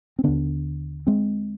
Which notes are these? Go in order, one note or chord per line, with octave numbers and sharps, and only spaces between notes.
C4
D#2 D3 B3 D4
G#3 C4